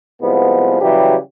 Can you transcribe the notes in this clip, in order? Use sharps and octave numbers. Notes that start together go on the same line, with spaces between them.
C2 F3 G#3 B3
C#3 E3 F#3 G3 F#4 G4